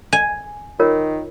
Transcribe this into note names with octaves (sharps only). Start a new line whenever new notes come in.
G#5
D#3 F4 A#4 C#5